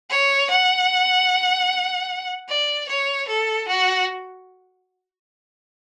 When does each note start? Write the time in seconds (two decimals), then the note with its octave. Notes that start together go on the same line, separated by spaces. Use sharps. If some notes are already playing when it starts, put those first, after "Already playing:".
0.10 C#5
0.50 F#5
2.48 D5
2.88 C#5
3.27 A4
3.68 F#4